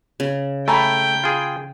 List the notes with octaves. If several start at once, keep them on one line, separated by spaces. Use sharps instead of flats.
C#3
A3 G5 G#5 A#5 B5
F4 G#4